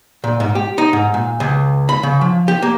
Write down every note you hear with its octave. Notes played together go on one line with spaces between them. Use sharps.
A#2
G#2
G4
D#4
G#2
A#2
C#2
B5
C#3
F3
G4
A#3